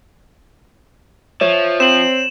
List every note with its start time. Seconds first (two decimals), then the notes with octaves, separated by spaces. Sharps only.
1.41 F3 C#5 E5
1.80 C4 E7 F#7